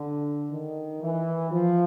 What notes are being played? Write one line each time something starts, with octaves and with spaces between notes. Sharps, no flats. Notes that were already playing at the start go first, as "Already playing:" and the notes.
Already playing: D3
D#3
E3
F3